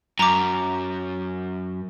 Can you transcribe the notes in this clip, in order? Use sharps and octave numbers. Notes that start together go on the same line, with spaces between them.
F#2 A#5 D6